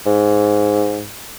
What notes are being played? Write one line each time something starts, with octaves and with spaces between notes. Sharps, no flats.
G#2